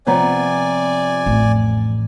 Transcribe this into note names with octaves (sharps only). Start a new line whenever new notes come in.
C3 F3 B3 C#5 D5 G#5 A#5
A1 F2